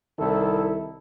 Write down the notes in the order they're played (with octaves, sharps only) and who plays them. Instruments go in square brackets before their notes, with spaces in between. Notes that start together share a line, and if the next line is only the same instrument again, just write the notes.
[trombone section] C2 D#3 E4 A4